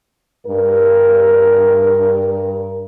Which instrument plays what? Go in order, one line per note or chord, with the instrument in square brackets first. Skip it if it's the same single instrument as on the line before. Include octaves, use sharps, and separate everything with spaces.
[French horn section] G2 A#4